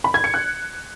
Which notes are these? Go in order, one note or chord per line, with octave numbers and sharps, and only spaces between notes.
B5
G#6
C#7
F#6